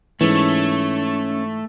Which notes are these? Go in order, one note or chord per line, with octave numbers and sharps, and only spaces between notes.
G#2 E3 A3 C#4